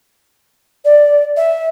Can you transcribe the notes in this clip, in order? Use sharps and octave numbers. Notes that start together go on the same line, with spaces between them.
D5
E5